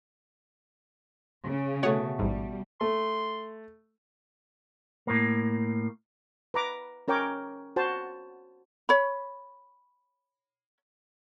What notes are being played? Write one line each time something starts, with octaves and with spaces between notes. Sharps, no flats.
C#3
B2 A3 C#5 F#5 G#5
A1 G#2 G3
A3 C6
A2 A#3
B4 A#5 D6
C#4 A#4 C#5 G5 D6
F#4 C5 A5
C#5 B5